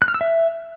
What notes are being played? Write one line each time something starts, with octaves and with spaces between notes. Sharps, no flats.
F#6
F6
E6
E5